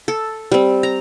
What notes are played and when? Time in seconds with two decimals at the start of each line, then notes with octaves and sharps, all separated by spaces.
0.08 A4
0.52 G3 C4
0.83 A#5